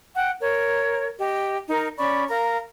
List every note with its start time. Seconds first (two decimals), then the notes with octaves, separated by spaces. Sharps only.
0.14 F#5 G5
0.40 A#4 C#5
1.19 G4 D#5
1.68 D#4 A#4
1.97 C#4 D5 B5 C#6
2.29 A#4 F5 A#5